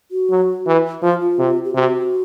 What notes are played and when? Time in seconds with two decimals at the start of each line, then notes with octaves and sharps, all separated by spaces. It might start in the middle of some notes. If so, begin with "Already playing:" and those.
0.11 F#4
0.30 F#3
0.66 E3
1.02 F3 F4
1.21 F4
1.39 C3
1.64 G4
1.75 C3 F#4